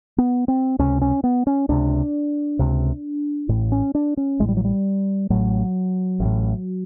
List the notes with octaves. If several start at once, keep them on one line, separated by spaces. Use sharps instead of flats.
B3
C4
C#2 C3 C#4
C#4
B3
C#4
C#2 C3 D4
C#2 C3
A1 A2
C#4
D4
C#4
A1 A2 G#3
G3
F#3
G3
A1 A2 F#3
A1
A2